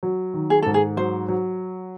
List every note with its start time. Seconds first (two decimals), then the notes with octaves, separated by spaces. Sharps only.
0.03 F#3
0.34 D#3
0.50 G#4
0.62 G#2 A4
0.74 G#4
0.97 F#3 C5
1.28 F#3